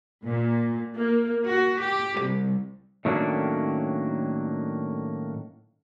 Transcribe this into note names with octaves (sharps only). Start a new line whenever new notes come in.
A#2
A#3
F#4
G4
C2
A2 D#3 F#3 A#3 C#4 D4